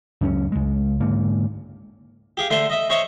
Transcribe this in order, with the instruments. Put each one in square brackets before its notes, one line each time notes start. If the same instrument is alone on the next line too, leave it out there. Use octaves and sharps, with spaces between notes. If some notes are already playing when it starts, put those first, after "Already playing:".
[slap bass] C#2 F#2 G#3 C#4
C#2 G#3
G#2 D3 A#3
[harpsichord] G4 G#4 F5
D3 A3 C5 C6
D#5 E5
C#4 C5 C#5 D#5 E5 C#6